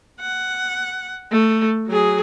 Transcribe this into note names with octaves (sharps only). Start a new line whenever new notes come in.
F#5
A3
F#3 G#4